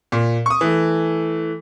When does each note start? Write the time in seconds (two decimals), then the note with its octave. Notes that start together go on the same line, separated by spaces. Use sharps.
0.12 A#2
0.46 C#6 D#6
0.61 E3 A3